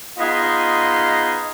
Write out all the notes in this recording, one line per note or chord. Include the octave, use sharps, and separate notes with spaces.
B3 D#4 F4 G#4 D#5